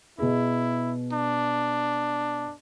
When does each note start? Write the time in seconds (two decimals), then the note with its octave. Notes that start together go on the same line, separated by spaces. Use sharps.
0.19 B2 E4 G#4
1.13 D4